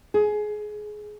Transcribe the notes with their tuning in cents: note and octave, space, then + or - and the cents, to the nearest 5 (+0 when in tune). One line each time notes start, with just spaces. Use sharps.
G#4 +20